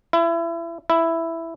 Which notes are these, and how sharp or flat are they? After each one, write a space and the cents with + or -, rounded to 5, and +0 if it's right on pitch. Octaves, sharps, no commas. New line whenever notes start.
E4 +30
E4 +5